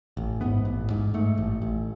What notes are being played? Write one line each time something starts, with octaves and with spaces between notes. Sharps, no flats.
A1
G#2 B3
A1
G#2
G#2 A3
A1
A1